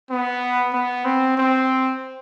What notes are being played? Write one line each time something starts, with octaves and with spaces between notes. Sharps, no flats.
B3
B3
C4
C4